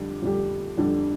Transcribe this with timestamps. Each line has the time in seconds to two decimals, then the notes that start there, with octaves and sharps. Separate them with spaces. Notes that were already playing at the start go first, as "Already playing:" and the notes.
Already playing: F2 D3 G3 D4 G4
0.22 F2 D3 G3 D4 G4
0.78 F2 D3 G3 D4 G4